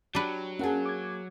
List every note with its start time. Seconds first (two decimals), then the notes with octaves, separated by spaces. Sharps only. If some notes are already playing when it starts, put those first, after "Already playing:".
0.15 F#3 D4 G4 B4
0.59 A#3 C#4 G#4 F#5 A5
0.86 D6 G#6